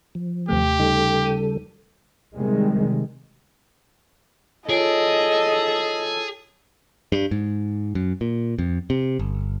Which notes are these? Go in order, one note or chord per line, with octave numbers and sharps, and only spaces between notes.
F3
D#2 C3 A3 G4
C#3 G3 D#4 A4
D#7
C3 D#3 G3 G#3
F4 G#4 A4 C#5 D#5 D7
G2
G#2
F#2
A#2
F2
C3
G1